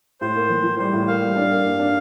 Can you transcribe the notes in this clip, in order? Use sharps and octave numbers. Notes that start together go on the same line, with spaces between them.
A2 C5
A#3
E3
E3
G3 C5
A2
A#3 F5
G3
D4
A#3
G2
D4